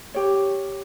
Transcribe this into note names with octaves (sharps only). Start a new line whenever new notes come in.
G4 C#5